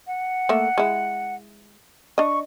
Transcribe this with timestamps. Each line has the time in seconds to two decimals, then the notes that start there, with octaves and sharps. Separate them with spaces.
0.07 F#5
0.49 A3 A#3 E5
0.78 G#3 E4
2.18 D4 D#5 C#6